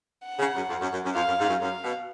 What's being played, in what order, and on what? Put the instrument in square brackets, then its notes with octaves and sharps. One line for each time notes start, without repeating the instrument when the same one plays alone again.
[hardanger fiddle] F#5
[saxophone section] C#3
F#2
F2
F#2
F#2
F#2
[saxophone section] F2 [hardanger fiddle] F5
[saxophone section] F#2
G#2
F#2
[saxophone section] F#2 [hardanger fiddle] F5
[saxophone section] B2